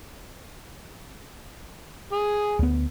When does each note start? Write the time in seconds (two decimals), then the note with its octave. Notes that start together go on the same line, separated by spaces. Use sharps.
2.12 G#4
2.59 D2 B3